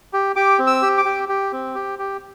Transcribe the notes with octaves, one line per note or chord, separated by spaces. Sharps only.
G4
G4 D6
C4
E6
G4
D6
G4
G4
C4
G4
G4